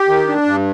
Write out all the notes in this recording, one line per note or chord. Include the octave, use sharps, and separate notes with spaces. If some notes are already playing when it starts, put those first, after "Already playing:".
Already playing: G4
D#3
D4
G2